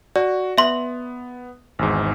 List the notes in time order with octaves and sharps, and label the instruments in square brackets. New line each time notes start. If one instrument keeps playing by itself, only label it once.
[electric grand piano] F#4 [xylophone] D5
[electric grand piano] B3 [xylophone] E5 C6
[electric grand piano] G#1 E2 G#2